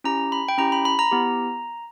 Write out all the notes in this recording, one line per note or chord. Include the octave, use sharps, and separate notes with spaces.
C#4 E4 G4 A#5
B5
G5
C#4 E4 G4 A#5
B5
B5
A#5
B3 E4 G4